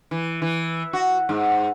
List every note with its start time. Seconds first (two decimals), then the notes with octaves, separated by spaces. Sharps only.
0.11 E3
0.42 E3
0.93 F#4
1.29 G#2